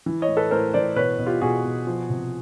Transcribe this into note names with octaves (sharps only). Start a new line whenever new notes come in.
E3
C#5 D#5
A2
A4 B4
A2 A#4 C5
E3 C5 D5
B2 B4 C#5
B2
F4 G4
B2 F#4 G#4
B2
F3
C3